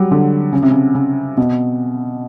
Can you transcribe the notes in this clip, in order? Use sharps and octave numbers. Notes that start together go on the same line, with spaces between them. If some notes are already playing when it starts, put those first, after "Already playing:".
Already playing: F#3 G3
D3
C#3
C3
C#3
C#3
B2